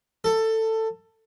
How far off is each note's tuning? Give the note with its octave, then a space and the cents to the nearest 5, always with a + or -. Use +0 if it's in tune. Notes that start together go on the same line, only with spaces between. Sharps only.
A4 +15